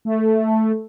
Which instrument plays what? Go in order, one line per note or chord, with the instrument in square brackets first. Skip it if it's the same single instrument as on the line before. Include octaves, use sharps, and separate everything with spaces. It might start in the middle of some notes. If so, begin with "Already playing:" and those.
[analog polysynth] A3